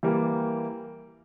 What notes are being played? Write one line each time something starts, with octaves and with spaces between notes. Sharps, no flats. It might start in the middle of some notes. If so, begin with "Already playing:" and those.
E3 G3 A#3